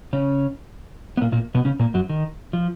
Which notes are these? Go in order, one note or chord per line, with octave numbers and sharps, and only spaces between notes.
C#3 C#4
B3
A#2 A#3
A#2 A#3
B2 B3
C#3 C#4
A#2 A#3
F#2 F#3
D#3
F3